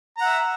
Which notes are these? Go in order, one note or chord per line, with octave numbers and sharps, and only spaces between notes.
E5 F#5 A#5